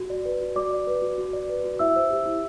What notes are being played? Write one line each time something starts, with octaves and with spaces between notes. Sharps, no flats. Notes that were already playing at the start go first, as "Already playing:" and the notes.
Already playing: F#4
D5
B4
F#4
F#4 D5 D6
D5
B4
F#4
F#4
D5
B4
F#4
E4 E5 E6
C5
G4
E4